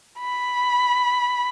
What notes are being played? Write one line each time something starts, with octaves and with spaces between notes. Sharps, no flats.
B5